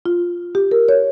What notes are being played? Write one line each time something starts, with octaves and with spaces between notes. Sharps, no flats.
F4
G4
A#4
C#5